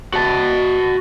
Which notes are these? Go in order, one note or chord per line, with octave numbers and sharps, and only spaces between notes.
F#4 A5